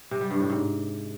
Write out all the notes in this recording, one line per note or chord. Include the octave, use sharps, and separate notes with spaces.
C3
G3
G2
A2
G#2